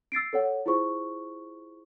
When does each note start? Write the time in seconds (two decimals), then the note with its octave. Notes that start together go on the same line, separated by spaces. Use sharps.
0.12 E6 A6 C7 D7
0.33 A4 C#5 F#5
0.66 E4 F4 G#4 C5 C#6